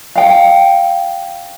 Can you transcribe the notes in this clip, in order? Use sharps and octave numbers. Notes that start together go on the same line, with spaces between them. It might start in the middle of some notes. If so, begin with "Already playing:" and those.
F5 G5